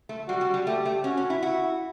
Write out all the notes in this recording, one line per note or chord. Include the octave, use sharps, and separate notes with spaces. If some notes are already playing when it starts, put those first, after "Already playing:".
A3
G3 F#4
G3
G3
A3 G4
A3
C#4 F#4
C#4
E4
E4 F#4